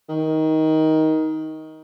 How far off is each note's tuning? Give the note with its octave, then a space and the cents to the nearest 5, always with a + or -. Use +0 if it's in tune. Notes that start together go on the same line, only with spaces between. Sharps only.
D#3 +15